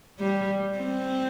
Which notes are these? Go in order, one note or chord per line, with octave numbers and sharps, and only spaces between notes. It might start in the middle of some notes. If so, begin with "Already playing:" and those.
G3
C4